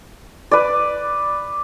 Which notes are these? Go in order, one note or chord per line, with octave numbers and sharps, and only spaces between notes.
B4 D5